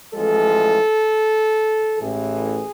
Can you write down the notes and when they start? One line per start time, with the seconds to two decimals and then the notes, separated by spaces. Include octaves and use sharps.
0.14 A1 A2 F3 G#3 A4
1.98 A1 A2 E3 G#4